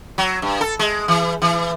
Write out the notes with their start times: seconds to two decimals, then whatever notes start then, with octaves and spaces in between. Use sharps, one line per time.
0.18 F#3
0.42 G2
0.61 A4
0.79 G#3
1.08 E3
1.42 E3